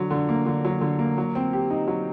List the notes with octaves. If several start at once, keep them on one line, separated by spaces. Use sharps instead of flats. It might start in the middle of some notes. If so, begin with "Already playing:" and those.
Already playing: D3 F#3
D3
A#3
D3
F#3
D3
A#3
F#3
C4
G4
D#4
F#3